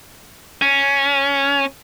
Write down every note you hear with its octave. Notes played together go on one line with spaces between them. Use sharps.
C#4